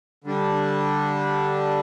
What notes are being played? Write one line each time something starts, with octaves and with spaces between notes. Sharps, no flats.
D3 G3 D4